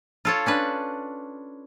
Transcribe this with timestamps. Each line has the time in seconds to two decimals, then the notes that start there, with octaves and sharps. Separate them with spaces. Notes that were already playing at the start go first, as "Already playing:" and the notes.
0.25 F4 A4 C#5
0.46 C#4 D4 B4